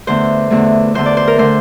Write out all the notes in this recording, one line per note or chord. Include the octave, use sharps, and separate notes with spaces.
E2 D3 A3 C5
E2 D3 A3
E2 D3 A3 C5
D5
C5
A#4
D3 A3 C5